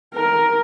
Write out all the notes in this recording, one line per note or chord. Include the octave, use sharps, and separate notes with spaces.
A#4